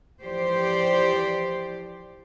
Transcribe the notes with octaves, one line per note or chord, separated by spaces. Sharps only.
E3 F3 G4 C5 D5